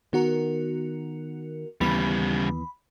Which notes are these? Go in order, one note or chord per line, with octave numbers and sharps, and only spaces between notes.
D#3 B3 F#4 A#4
D#2 C#3 E3 G3 B3 B5